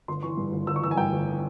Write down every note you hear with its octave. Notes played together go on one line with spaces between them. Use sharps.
G1 C6
E3 C#6
G2
G1
G1 E6
C#6
E3 E6
G#5
G2 G5
G1